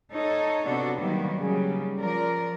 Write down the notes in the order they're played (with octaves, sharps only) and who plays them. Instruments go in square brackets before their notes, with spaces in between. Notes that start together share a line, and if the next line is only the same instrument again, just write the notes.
[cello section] D#4 A4 C#5
C3 B3 D4 F#4 A4
D#3 F#3 G3 A#3 B3
C#3 F#3 G3
F3 A#4 D5